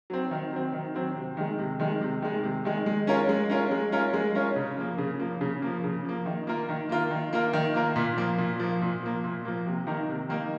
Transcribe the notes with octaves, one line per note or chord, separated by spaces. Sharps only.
F#3 C4
D#3
F#3 C4
D#3
F#3 C4
C3
D#3 G#3
C3
D#3 G#3
C3
D#3 G#3
C3
D#3 G#3
G#3
C#4 F4 A#4 C#5
G#3
C#4 F4 A#4 C#5
G#3
C#4 F4 A#4 C#5
G#3
C#4 F4 A#4 C#5
C#3
F3 A#3
C#3
F3 A#3
C#3
F3 A#3
C#3
F3 A#3
D#3
A#3 F4 A#4
D#3
A#3 F4 A#4
D#3
A#3 F4 A#4
D#3
A#3 F4 A#4
A#2
F3 A#3
A#2
F3 A#3
A#2
F3 A#3
A#2
F3 A#3
C3
D#3 A#3 D#4 A#4
C3
D#3 A#3 D#4 A#4